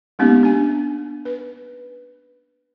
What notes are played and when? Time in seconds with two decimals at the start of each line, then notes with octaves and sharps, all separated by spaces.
0.19 G#3 A#3 B3 C#4 D#4 G4
0.43 D4 G#5
1.25 B4